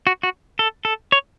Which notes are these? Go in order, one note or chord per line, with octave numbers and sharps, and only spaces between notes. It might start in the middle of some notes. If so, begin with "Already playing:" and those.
F#4
F#4
A4
A4
C#5